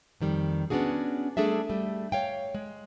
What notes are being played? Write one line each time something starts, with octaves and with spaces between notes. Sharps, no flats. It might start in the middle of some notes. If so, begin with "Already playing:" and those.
F2 D#3 G3
B3 C#4 D4 F#4 G#4
G3 A3 D4 G#4 A4 E5
G3 A3
C#5 F5 G5
G#3